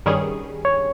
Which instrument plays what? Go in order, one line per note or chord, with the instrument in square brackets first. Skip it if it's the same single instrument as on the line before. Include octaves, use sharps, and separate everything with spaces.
[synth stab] G2 D#3 G3 C#4 G#4
[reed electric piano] C#5